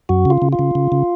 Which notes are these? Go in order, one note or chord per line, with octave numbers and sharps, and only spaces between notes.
F#2 F#4
C#3 F4
C#3
F4
C#3
C#3
C#3